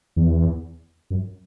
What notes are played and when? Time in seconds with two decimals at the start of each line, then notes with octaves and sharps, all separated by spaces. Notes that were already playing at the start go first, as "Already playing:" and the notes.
0.16 E2
1.10 F#2